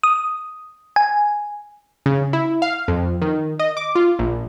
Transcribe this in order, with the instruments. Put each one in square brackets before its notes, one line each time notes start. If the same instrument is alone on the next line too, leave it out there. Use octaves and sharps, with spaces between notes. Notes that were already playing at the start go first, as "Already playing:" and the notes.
[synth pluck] D#6
G#5
[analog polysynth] C#3
E4
F5
F2
D#3
D#5
D6
F4
A#1